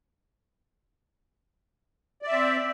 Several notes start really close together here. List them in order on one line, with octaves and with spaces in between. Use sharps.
D5 E5 C4